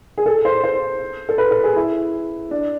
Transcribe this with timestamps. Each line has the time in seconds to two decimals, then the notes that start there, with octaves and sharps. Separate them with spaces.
0.18 G#4
0.26 A4
0.45 C5
0.64 C5
1.29 A4
1.38 B4
1.51 A4
1.64 G#4
1.76 E4
2.51 D4